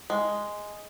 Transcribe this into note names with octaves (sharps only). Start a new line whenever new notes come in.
G#3